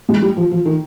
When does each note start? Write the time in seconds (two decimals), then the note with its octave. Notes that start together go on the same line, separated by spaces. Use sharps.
0.09 G#3
0.22 G3
0.37 F3
0.51 F3
0.65 D#3